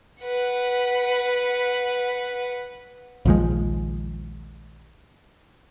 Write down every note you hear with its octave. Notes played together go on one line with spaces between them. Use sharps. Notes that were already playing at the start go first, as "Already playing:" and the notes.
B4 F#5
A#1 D#2 F3 G#3